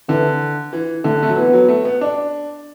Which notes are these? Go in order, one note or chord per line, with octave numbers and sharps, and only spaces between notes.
D3 E3
E3
D3 A3
A3
F#3
E3 B3
F#3
A3
B3
D4